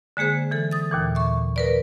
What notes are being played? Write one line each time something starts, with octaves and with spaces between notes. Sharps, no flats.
D3 G#3 A#3 G#4 C5
E3 A4
D#6 A6
D#2 A#2 E3
E5 C#6
A#4 B4 D5